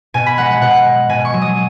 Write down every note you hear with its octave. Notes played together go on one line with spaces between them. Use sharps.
B2 G#5
B5
G#3 F#5
F#5
B2 F#5
G#3
B2 G#5
C#6
F#3
D#6